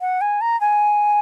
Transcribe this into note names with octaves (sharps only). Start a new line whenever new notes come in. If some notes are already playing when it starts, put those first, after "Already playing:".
F#5
G#5
A#5
G#5